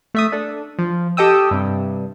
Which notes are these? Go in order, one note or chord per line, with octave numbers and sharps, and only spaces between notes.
A3 E5 D#6
D4 A4
F3
G4 A4 D#5 G5 D#6 E6
G2 C3